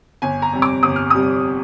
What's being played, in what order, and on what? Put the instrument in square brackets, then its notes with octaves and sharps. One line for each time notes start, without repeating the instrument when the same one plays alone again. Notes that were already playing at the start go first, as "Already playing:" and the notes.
[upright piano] G1 G#5
A#5
F2 C3 G3
D6
G1 D#6
F6
F2 C3 G3 D#6